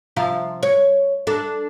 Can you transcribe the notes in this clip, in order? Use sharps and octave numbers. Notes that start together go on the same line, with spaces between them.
C3 F3 F5
C#5
D4 A4